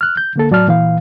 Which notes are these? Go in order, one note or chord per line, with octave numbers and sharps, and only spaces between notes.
F6 F#6
G6
D3 A#3 A4
A2 F#3 D5 A5 F6
A#2 E3 F5